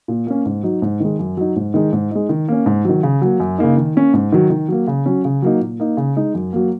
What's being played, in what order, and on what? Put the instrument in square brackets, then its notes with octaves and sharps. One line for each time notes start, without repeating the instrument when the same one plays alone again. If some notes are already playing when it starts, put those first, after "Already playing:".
[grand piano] A#2
A#3 C#4
G#2
F#3 D#4
G#2
D#3 G#3
F#2
F#3 D#4
G#2
D#3 G#3 D#4
G#2
G#3 D#4
D#3
A#3 C#4
G#2
D#3 F#3
C#3
F#3 A#3
F#2
C#3 A#3 D#4
D#3
A#3 C#4
G#2
D#3 F#3
D#3
F#3 A#3
C#3
F#3 C#4
C#3
F#3 A#3 D#4
A#2
A#3 D#4
C#3
G#3 D#4
F#2
F#3 A#3